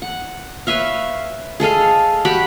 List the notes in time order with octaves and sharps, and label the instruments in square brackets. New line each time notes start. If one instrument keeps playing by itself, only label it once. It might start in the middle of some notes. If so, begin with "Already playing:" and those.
[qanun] F#5
B4 C#5 E5 F5
G#4 A4 D#5 F5
F#4 G4 B5